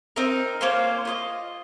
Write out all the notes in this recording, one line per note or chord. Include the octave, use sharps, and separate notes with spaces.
C4 D#4 A#4
A#3 C#4 F4 C5
F4 C5 D#5